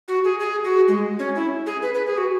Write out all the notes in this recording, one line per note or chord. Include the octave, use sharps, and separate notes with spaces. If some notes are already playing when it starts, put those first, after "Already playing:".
F#4
G#4
G#4
F#4
G#3
C#4
E4
G#4
B4
B4
G#4
F#4